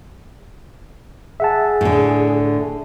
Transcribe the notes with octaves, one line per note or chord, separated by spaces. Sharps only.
G#4 E5 F#5 A5
A2 D3